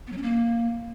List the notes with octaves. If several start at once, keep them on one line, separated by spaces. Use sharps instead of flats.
B3
F#3
C#4
A#3